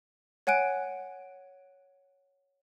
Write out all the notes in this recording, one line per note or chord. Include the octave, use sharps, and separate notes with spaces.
C#5 F#5 G#5 F#6 D7